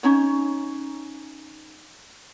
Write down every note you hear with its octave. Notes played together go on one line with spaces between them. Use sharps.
C#4 D#4 C#5